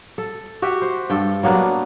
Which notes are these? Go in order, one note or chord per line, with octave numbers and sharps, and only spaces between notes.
A4
F#4 G4 E5
C5
G2 A4 G5
F#3 A#3 B3 D4